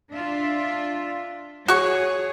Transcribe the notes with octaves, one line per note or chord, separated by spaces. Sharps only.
D4 F4 E5
F#4 G#4 C#5 C#6